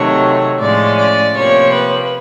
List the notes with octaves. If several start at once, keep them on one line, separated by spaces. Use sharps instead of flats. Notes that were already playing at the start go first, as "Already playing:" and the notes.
Already playing: C3 D#3 F#3 A3 C#5
A2 F3 G#3 C#4 D5
D5
C3 F3 A#3 C#5
B4